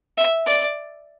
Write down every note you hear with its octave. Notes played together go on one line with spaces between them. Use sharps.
E5
D5